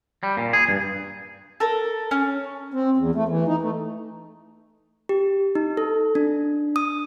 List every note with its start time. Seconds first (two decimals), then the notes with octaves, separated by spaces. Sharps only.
0.23 G3
0.37 A#2
0.53 G#4
0.69 G2
1.60 A4 A#4
2.11 C#4
2.74 C4
2.97 E2
3.15 A3
3.28 E3
3.48 D#4
3.61 A3
5.09 G4
5.55 D#4
5.77 A4
6.15 D4
6.76 D#6